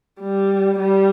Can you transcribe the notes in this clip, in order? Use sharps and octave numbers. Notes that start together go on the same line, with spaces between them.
G3
G3